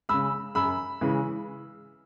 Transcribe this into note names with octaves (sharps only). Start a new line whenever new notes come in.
C#3 G#3 B5 E6
F#2 B5 E6
C#3 E3 G#3